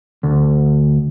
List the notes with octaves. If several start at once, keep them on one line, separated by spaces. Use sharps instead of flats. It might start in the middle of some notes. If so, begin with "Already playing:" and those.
D2